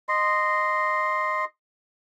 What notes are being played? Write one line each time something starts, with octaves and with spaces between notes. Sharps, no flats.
D#5 C6